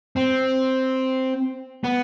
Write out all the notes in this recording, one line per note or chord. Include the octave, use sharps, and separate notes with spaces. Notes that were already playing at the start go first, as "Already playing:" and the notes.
C4
B3